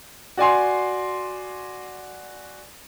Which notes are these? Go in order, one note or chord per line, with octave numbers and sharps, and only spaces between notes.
F#4 D5 G#5 C6